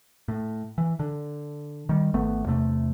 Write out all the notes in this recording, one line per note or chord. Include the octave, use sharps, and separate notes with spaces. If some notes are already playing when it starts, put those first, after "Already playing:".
A2
E3
D3
D#3 G3
G#1 A3 B3
E2 C3 A3